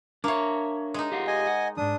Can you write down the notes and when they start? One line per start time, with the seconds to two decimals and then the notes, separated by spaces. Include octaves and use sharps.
0.24 A#3 D4 C#5 E5
0.94 G#3 D#4
1.12 G4 F5 F#5
1.27 D#5 G#5
1.47 F#5
1.77 E2 G#2 D4 D#6